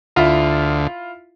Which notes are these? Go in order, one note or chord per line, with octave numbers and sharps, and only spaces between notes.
D2 E4 F4